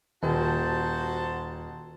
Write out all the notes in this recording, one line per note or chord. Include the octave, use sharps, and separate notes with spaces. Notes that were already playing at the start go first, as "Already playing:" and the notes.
D#1 F#4 C5 A5